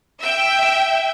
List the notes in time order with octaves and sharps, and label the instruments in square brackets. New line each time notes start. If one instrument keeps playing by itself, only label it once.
[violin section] E5 G5